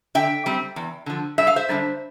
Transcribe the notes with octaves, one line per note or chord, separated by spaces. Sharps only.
D3 E5 G5
G3 C4
E2
D3 F3
G2 E5
F5
C5 E5
D3 G3 D4